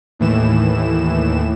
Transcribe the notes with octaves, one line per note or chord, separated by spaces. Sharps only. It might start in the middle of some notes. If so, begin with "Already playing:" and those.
D#2 A2 E3 E7